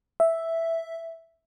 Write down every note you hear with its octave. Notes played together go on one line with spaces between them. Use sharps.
E5